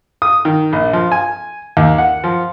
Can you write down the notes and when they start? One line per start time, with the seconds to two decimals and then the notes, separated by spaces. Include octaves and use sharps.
0.22 D#6
0.45 D#3
0.73 A#1
0.93 F3
1.12 G#5
1.77 D#2
1.98 F#5
2.24 F3